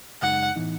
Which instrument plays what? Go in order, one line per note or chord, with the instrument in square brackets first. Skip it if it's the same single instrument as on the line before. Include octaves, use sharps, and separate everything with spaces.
[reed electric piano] F#2 C#3 G#3 D#4 [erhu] F#5
[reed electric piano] A2 E3 B3 D#4